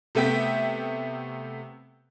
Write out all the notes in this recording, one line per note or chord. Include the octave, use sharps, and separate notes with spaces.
C3 A3 B3 E5 G5 B6